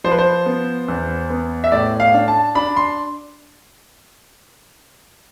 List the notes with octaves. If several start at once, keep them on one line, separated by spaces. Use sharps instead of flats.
F3 C5
B4
C5
B3
E2
B3
E5
A2 D5
F5
D4
A5
D4 B5
C6